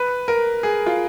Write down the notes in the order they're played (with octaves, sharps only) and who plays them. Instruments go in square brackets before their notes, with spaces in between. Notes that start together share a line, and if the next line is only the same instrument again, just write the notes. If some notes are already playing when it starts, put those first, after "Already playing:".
Already playing: [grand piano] B4
A#4
G#4
F4